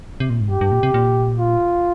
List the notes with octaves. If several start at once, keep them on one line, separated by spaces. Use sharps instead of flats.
C3
A#2
G#2
G2 G4
G2
A#2
C3
A#2
F4